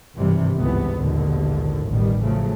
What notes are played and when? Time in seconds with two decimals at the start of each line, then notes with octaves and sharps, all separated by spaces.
0.15 G#1 G2 C3 E3 G3
0.58 G1 C#2 C3 E3 B3
0.97 A#1 D#2 G#2 B2 D3
1.86 A1 B2 D#3 G3
2.21 C#3 F3 F#3 A3